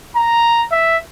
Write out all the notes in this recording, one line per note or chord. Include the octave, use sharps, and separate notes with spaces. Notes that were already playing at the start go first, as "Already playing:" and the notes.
A#5
E5